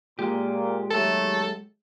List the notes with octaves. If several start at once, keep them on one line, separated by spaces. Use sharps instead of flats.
A#2 G#3 G4
D#2 F#3 A3 A4